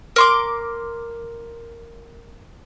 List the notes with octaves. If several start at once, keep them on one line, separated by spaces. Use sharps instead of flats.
A#4 C6 D6